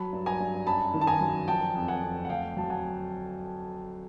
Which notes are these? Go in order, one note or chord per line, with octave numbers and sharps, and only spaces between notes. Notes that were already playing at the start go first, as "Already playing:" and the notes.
Already playing: F#3 A5 B5
G2
G#5 A#5
G2
F#2 A5 B5
D#3
A5
G#5 A#5
F#3
F3 G5 A5
F2
F#5 G#5
F2
F#5
D2 F5 G5
F#3 A5
F#5 G#5